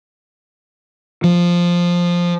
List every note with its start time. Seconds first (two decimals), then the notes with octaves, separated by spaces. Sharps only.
1.24 F3